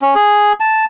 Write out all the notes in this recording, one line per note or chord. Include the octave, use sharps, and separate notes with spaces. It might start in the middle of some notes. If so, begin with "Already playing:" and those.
C#4
G#4
A5